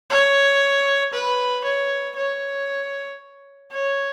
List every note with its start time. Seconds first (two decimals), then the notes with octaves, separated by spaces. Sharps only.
0.10 C#5
1.13 B4
1.65 C#5
2.16 C#5
3.71 C#5